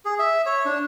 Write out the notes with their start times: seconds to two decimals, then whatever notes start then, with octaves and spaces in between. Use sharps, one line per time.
0.05 G#4
0.19 E5
0.46 C#5
0.65 D4